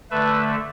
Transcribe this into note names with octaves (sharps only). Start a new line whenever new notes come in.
D3 A3 B4 E5